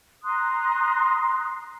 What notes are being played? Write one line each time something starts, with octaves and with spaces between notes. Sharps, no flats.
A#5 C6 D#6 F#6